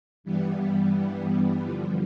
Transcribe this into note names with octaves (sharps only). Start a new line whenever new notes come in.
G2 E3 G3 B3
G2 D3 F3